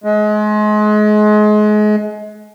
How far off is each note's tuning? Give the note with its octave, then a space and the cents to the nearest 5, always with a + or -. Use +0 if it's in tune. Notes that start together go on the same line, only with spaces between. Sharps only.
G#3 +30